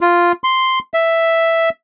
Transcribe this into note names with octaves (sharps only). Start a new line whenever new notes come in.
F4
C6
E5